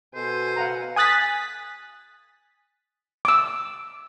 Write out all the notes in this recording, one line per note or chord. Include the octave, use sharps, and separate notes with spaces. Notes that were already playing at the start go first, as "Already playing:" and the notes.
B2 A4 C5 G#5
F5 F#5 A#5
G#5 D#6 F#6 A6 B6
D6 E6